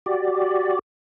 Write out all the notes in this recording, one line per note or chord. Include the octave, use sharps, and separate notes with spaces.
F#4 G4 D5